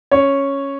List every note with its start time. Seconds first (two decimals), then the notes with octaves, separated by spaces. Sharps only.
0.12 C#4 C#5